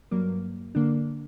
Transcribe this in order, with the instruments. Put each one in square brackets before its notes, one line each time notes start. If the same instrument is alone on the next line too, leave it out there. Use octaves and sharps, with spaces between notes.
[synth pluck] G2 F#3 A#3
D3 A#3 D4